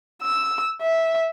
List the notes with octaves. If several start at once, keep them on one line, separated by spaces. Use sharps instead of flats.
E6
E5